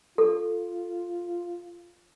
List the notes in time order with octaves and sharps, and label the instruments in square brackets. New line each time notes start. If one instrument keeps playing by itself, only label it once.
[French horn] F4 [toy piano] A4